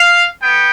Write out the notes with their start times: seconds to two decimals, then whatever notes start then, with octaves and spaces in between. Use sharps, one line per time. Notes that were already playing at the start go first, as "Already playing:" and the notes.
Already playing: F5
0.42 B3 G5